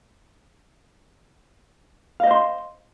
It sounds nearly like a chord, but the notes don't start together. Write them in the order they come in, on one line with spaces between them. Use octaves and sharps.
F5 D#5 C5 C6